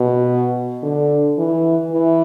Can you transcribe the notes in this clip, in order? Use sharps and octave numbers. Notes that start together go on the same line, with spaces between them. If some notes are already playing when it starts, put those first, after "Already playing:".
Already playing: B2
D3
E3
E3